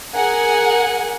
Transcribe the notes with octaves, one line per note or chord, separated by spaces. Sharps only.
G#4 A#4 F#5 G#5